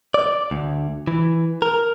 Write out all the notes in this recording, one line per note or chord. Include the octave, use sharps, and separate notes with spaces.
D5
D2
E3
A#4